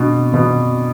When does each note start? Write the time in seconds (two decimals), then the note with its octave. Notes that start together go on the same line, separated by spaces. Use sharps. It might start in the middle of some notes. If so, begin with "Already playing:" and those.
Already playing: B2 D4
0.34 B2